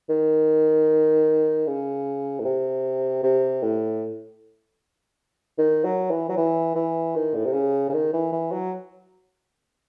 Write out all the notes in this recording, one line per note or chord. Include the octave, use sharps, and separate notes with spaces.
D#3
C#3
A2
C3
C3
A2
D#3
F#3
E3
F#3
E3
E3
D#3
A2
C3
C#3
C#3
D#3
E3
E3
F#3